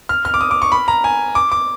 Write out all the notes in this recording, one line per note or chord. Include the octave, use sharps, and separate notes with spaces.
F6
F6
D6
D#6
D6
C#6
B5
A#5
G#5
D6
D6